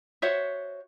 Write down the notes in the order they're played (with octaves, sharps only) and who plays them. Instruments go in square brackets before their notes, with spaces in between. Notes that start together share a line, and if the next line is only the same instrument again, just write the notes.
[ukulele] F#4 C5 C#5 E5